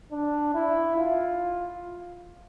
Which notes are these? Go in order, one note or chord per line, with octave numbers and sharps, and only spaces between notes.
D4
E4
F4